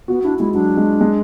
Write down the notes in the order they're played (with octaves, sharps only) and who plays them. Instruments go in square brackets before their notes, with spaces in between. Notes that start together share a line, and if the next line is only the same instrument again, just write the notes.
[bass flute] B3 [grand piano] F#4
[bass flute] D4 [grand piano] E4
[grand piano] G#3 [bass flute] E4
[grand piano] F#3 [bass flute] D4
[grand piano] G#3
G#3